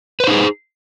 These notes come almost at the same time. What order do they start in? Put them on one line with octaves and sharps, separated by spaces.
B4 C5 D#4 G#4